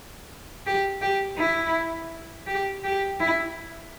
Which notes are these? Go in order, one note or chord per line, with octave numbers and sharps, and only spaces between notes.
G4
G4
E4
G4
G4
E4